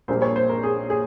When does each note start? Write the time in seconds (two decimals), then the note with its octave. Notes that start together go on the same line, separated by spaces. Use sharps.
0.08 A#1 A#2 G3 A#3 C5
0.22 C#5
0.36 C5
0.49 A#4
0.63 G#4
0.90 G#4